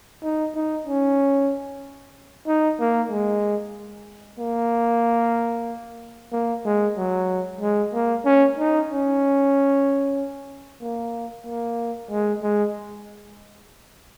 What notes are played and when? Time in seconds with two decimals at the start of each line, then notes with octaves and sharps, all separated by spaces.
0.22 D#4
0.54 D#4
0.87 C#4
2.47 D#4
2.79 A#3
3.11 G#3
4.39 A#3
6.32 A#3
6.65 G#3
6.97 F#3
7.61 G#3
7.93 A#3
8.25 C#4
8.58 D#4
8.90 C#4
10.81 A#3
11.47 A#3
12.11 G#3
12.42 G#3